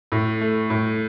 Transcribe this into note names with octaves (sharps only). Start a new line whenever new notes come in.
A2
A3
A2